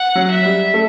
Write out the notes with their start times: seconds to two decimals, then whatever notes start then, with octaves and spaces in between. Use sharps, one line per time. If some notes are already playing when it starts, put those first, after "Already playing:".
Already playing: F#5
0.15 F#3
0.31 E5
0.45 G3
0.74 A3